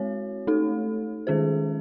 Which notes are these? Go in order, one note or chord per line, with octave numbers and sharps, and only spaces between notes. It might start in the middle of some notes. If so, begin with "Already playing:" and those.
Already playing: G#3 C4 F#4 C#5
A3 D#4 A4
D#3 G#3 C#4 G#4 C5